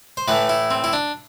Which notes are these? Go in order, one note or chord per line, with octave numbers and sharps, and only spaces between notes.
C5
A2 E3 A3 B4
E4
C4
E4
D4